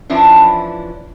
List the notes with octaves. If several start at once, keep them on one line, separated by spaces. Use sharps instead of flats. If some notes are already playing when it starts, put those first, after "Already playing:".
E3 F3 C#4 D4 E4